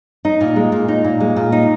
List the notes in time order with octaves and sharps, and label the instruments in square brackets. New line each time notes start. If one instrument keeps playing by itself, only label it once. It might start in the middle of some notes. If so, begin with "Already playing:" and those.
[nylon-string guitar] D#4
A#2
G#3
A#2
D#4
A#2
G#3
A#2
D#4